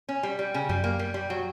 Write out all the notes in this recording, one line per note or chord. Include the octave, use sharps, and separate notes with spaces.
C#4
G3
G3
C#3
F#2 G3
A#3
G3
G3
F#3